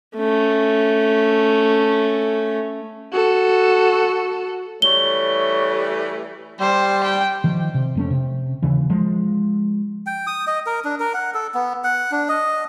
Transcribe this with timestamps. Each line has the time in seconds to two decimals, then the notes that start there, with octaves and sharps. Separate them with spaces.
0.17 A3 C#4
3.12 F#4 A4
4.82 E3 G3 A3 C#5 G7
6.60 G3 C5
7.04 G5
7.44 D#3 F3
7.74 C3
7.95 F2 A3 C#4
8.10 C3
8.62 D#2 C#3 E3
8.90 F3 G#3
10.06 G5
10.27 D#6
10.47 D#5
10.66 A#4
10.84 D4
11.00 A#4
11.14 F#5
11.34 A4
11.54 B3
11.84 F#5
12.12 D4
12.29 D#5